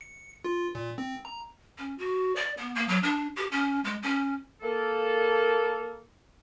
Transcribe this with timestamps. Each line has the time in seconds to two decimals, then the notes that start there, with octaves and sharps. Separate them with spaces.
0.01 C#7
0.45 F4
0.75 A#2
0.98 C4
1.25 A#5
1.78 C#4
1.98 F#4
2.36 D5
2.57 B3
2.75 A#3
2.88 F#3
3.03 D4
3.36 G4
3.52 C#4
3.84 G#3
4.03 C#4
4.62 A#3 A4